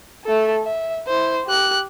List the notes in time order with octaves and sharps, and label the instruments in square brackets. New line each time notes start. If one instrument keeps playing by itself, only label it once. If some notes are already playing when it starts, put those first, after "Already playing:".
[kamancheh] A3 A4
E5
E4 C5
G4 F#6